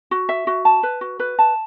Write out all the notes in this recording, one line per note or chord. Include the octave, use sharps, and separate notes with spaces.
F#4
E5
F#4
A5
B4
F#4
B4
A5